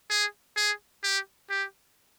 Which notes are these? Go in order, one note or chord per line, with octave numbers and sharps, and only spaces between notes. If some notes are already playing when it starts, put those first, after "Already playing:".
G#4
G#4
G4
G4